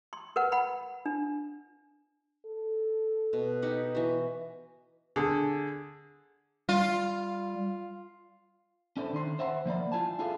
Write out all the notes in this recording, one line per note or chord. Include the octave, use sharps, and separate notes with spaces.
C6
A#4 B4 F#5
F#5 B5
D4
A4
B2
D#4 G4 F#5
E3 F#4
D3 G#4
G3 F4
C#4 D4 E4 A4 C5
D#3 C#4 C6
C5 E5 F#5 B5 C6
F3 A#3 D5 B5
E4 F4 G#5 A5
E4 F4 G#4 A4 F5